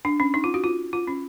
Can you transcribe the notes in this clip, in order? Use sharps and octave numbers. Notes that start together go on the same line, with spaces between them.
D4
C#4
D#4
F4
F#4
F4
F4
C#4